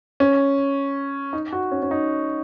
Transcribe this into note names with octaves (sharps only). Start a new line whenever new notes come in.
C#4
D#4
F#4
C#4
C#4
D#4